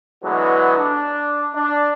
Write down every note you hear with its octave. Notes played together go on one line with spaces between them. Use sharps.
D3 E3 F#3 G#3 B3
D4
D4